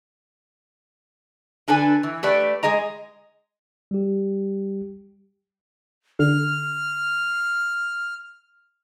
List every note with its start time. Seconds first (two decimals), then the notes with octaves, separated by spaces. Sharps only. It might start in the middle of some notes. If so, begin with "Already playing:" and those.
1.68 D3 D4 A4 B4 G#5
2.03 E3
2.23 A3 G4 B4 D5
2.63 G#3 G#4 D#5 A#5
3.91 G3 G4
6.19 D3 F6